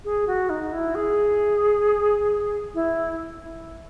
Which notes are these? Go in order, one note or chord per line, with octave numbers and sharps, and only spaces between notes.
G#4
F#4
D#4
E4
G#4
E4